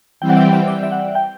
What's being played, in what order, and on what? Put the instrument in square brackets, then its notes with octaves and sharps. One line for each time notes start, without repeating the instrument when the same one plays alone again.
[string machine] E3 G3 C4 G4 [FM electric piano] G5
[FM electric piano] F#5
E5
E5
D5
E5
F#5
G5